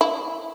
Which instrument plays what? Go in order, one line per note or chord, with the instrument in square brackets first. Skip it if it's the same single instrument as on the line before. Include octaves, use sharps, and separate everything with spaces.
[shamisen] E4